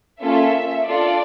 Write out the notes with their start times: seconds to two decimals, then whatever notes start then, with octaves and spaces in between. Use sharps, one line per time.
0.22 A#3 C#4 F4 A4 E5
0.88 D4 F4 A4 D5